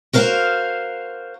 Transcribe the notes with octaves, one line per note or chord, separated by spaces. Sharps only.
F#4 A#4 C5 F5